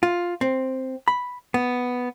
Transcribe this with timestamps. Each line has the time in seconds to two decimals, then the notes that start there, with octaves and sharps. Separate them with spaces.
0.03 F4
0.41 C4
1.08 B5
1.54 B3